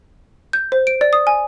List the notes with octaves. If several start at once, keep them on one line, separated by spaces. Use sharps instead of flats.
G6
C5
D7
D5
D#6
G#5